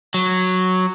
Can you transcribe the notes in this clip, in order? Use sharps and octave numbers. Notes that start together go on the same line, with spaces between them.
F#3